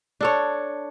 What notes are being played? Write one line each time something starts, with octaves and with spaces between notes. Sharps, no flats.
D4 A4 C#5